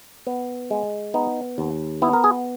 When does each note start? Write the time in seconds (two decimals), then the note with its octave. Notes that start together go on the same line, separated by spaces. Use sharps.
0.27 B3
0.71 G#3
1.14 B3 D#4
1.58 D#2
2.02 B3 E4
2.13 A#4
2.24 G#4